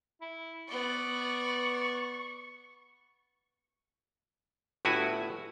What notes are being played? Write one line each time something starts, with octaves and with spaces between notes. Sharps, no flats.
E4
B3 D5 C#6
G1 A2 E4 F#4 G#5